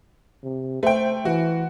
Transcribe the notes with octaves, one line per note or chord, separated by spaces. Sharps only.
C3
A3 C5 G5
E3 F#4